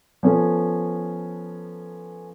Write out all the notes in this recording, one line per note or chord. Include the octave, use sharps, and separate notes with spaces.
F3 B3 C#4 A4 G#5